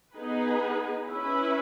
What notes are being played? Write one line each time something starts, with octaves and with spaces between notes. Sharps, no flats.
B3 D#4 G#4 B4
C#4 E4 B4